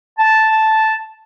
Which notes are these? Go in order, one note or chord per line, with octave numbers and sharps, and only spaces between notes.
A5